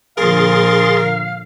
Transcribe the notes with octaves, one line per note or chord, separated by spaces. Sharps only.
A#2 D3 F3 G#4 A#4 F5 C6 A6